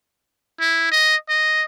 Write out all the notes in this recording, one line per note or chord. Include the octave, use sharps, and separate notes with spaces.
E4
D#5
D#5